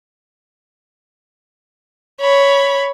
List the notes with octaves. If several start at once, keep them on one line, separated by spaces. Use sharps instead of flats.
C#5 B5